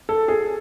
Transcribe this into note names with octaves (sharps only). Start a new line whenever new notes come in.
A4
G#4